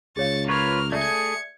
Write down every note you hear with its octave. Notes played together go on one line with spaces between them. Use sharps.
C#2 G#4 C#5 F5 C#6 A6
A#3 F4 B4 C#5 C#6 F6
A3 G#4 D5 E5 G#6 C#7